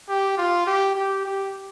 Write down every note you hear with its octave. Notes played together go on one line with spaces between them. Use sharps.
G4
F4
G4
G4
G4